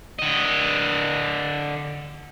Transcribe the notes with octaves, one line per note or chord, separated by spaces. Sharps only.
D3 D#5